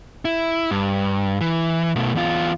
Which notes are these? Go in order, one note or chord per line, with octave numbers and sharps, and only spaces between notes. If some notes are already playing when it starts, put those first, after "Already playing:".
E4
G2
E3
B2 A3
E2 F4